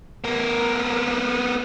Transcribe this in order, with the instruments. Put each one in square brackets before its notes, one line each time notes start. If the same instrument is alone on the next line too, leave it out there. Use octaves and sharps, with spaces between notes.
[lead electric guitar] B3 A#4